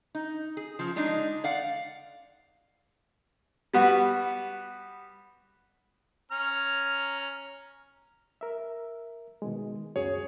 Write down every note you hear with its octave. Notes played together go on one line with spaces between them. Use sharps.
D#4
G#4
C#3 F3
G#3 D4 D#4
D5 F5 F#5
G3 B3 F#4
C#4 A#5 F6
A#4 E5
B2 D#3 G#3
C#2 F#2 F#3 G#4 C#5